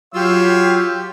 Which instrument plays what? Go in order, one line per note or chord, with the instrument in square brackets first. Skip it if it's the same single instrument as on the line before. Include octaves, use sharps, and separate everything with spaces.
[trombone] F#3 [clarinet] F4 [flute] G4 [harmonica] C#5 F5 E6